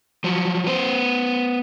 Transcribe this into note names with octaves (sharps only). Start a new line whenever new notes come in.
F3 F#3
B3 C5